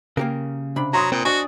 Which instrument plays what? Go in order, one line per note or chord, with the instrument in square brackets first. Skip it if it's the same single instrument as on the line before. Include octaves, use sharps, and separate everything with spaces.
[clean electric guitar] C#3 [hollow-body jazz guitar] A#3 G4 A#4
[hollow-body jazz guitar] C3 D4 B5
[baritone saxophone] F#3 [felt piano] A#5 C6 D#6
[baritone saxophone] A#2 [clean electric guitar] C4
[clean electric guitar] D4 [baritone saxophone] F#4 [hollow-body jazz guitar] C5 D#5 G#5 [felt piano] C#6